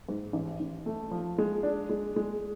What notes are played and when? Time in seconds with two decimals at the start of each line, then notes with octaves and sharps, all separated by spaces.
0.09 G#2
0.33 A1
0.60 A1
0.86 A3
1.11 F3
1.38 G#3
1.63 D4
1.89 G#3
2.16 G#3